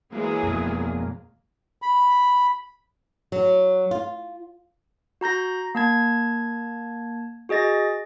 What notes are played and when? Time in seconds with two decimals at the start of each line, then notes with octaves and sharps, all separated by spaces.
0.13 E3 F#3 G#3 A#3 G#4
0.43 F2 B2
1.82 B5
3.32 F#3
3.91 F4
5.21 F#4 A#5 G6 A#6
5.75 A#3 A5 G#6
7.49 F#4 G#4 D#5 A6 A#6